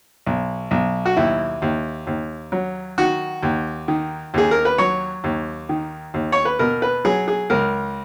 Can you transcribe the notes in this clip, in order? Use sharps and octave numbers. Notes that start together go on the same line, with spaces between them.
B1
B1
F#4
D#2 E4
D#2
D#2
F#3
D#3 F#4
D#2
D#3
D#2 G#4
A#4
B4
F#3 C#5
D#2
D#3
D#2
C#5
B4
B2 A#4
B4
F#3 G#4
G#4
C#2 A#4